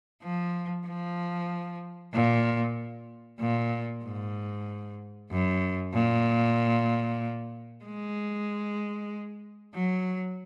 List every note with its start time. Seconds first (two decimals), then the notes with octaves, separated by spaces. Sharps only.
0.23 F3
0.87 F3
2.14 A#2
3.40 A#2
4.04 G#2
5.31 F#2
5.94 A#2
7.85 G#3
9.75 F#3